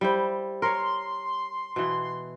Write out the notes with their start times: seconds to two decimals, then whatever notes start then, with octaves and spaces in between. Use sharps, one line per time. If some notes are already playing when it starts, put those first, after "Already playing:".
0.01 G3 E4 C5
0.62 A#4 C#5 C6
1.76 B2 E3